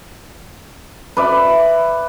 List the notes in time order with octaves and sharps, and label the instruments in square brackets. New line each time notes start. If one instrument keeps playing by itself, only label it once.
[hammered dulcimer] B4 D5 E5